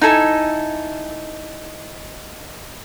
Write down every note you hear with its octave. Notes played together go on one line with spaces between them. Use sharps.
D#4 E4 A4 G#5